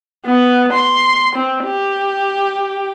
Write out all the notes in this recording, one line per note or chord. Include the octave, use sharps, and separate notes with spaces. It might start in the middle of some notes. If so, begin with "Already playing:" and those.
B3
C6
C4
G4